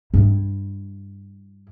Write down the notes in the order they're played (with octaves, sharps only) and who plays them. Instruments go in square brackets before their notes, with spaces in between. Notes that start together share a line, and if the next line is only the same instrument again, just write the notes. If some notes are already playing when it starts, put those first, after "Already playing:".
[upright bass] G2 E4